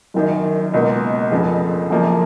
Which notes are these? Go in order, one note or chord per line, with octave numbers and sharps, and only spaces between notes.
F#1 F#2 D#3
C#2 B2 A#3
F1 F2 C#3
F#1 F#2 F3 A#3